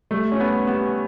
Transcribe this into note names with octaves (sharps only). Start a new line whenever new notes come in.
G3 A3
C#4
G3 B3
B3 G4